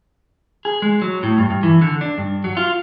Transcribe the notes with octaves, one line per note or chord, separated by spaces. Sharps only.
G#4
G#3
F#3
A2
G2
G2
E3
D3
D4
G2
F#3
F4